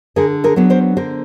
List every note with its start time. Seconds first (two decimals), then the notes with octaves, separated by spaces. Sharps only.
0.16 D3 G#4 A#4
0.44 G#4 A#4
0.56 F#3 B3 D4
0.70 A#4 C5
0.97 D3 A#4 C5